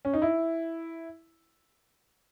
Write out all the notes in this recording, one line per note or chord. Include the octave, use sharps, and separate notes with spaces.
C#4
D#4
E4